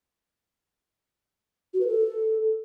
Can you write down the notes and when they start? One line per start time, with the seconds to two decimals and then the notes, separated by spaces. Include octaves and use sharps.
1.74 F#4
1.80 B4
1.87 A4